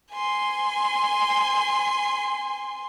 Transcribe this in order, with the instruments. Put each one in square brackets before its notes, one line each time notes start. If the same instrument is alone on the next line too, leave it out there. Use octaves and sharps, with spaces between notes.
[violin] G#5 C6